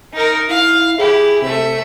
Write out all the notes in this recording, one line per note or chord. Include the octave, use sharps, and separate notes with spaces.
D#4 A#4
E4 F5
E4 G4 G#4
C3 A3 E5